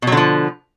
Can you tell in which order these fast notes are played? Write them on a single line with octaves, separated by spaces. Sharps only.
B2 F#3 D3 F3